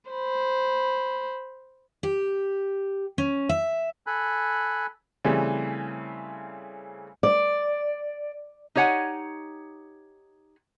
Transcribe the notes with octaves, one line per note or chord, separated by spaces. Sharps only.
C5 B5
G4
C#4
E5
A4 G#5 B5 F#6
C#3 E3 G3 A3 C4
D5
D#4 G4 C#5 F#5 G#5